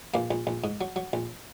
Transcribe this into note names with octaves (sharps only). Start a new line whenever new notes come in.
A#1 A#3
A#1
A#1
G#2
F#3
F#3
A#1